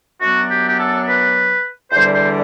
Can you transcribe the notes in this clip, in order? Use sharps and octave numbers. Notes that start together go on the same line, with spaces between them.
F#2 F#3 B3 D4 F#4
G4
G4
A4
B4
E2 D3 G3 D4 C5
C5